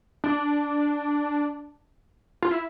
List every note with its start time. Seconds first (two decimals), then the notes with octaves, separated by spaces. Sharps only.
0.24 D4
2.43 F4
2.51 E4